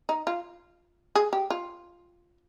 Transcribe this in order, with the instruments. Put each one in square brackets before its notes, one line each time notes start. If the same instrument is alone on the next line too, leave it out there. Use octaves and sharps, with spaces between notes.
[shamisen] D#4
F4
G#4
G4
F4